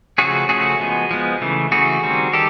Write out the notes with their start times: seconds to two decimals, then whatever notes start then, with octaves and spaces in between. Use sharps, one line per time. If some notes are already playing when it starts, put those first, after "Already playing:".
0.18 C#3 F3 A3 C#4 F#4 G#4
0.49 C#3 F3 A3 C#4 F#4 G#4
0.80 F3 G#3 B3
1.11 F3 G#3 B3
1.41 C#3 E3 A3
1.72 C#3 E3 A3 F#4 G#4
2.03 D#3 G3 C4
2.33 D#3 G3 G4 A4